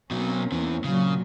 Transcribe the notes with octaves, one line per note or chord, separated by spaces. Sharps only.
B2 F#3 A#3 C4 C#4
E2 E3
A#2 C#3 F#3